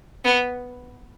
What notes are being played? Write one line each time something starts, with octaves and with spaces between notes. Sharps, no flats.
B3